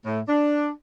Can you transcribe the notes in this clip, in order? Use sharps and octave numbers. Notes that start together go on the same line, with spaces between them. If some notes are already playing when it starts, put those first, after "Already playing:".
A2
D4